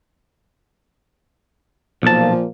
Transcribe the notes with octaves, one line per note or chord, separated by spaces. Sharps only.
B1 A#2 F3 A#3 A5